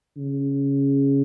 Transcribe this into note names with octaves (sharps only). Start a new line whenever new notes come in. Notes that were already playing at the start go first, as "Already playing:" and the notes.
C#3